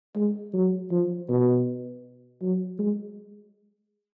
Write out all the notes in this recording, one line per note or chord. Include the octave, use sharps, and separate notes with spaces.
G#3
F#3
F3
B2
F#3
G#3